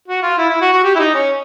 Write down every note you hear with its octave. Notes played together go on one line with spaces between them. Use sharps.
F#4
F4
E4
E4
F#4
F#4
G4
E4
D#4
C#4